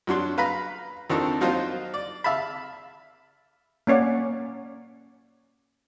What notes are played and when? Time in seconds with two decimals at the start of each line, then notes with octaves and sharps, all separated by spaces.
0.07 F#2 F#3 D4 C6
0.38 B4 F5 A#5 B5
1.10 F2 D#3 C4 D4 A4 C#6
1.40 F3 F#3 D#4 F4 A#4 C5
1.94 D5
2.24 E5 F5 A5 B5
3.87 A#3 C#4 C#5 D5 F#5